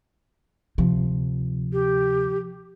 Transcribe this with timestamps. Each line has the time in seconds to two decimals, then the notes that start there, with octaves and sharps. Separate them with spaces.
0.78 D2 C3 F3
1.73 G4